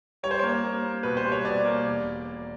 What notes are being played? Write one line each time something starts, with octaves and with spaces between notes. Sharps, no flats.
G3 C#5
C5
A#3 C#5
A#3
A#3
B2 B4
C5
G3
C#5
B2 D5
A#3
E1